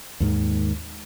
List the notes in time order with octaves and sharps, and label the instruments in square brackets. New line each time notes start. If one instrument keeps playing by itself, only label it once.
[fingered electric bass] D#2 G#2 D#3